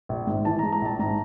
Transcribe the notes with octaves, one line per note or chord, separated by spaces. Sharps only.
A#1
G#2
E3 A5
G#3 A#5
A#5
A#1 A5
G#2 A#5